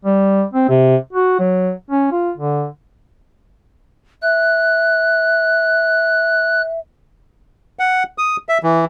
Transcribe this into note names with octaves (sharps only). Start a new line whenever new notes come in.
G3
C4
C3
F#4
F#3
C#4
F4
D3
E5 F#6
F#5
D#6
E5
E3